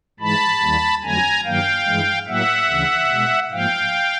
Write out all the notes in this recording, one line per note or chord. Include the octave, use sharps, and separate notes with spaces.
G#2 E3 G#3 A5 B5
D#2 D#3 G3 A#3
F2 D3 F#3 A3 G#5 A#5
G2 D#3 F#3 A#3 F5 G5
G2 E3 G#3
A2 F#3 A#3 E5 F#5
D2 C#3 E3
B2 G#3
G#2 F3 A#3 F5 G5